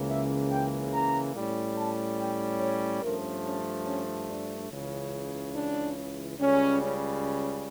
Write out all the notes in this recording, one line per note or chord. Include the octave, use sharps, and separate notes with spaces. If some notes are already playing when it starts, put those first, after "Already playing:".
Already playing: C#2 C#3 E3 A#3
E5
G5
A#5
A2 G3 C#4
A5
G5
C#5
G2 F3 A3 C#4 A#4
C#4
C#4
D4
C#2 C#3 E3
D4
C#2 C#3 G3 C#4
C#4
C#4